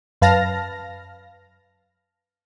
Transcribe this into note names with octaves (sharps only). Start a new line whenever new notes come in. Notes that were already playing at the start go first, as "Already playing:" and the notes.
F#2 B4 F5 A5 F6 A#6